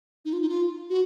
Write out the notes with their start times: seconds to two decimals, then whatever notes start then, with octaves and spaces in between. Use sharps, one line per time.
0.25 D#4
0.33 F4
0.42 D#4
0.49 F4
0.90 F#4